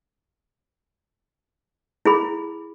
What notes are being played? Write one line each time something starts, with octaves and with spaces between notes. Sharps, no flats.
E4 G#4 B5